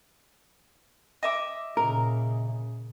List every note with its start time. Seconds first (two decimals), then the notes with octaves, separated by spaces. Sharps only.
1.23 D#5 E5 D6
1.77 A#2 C#3 A#4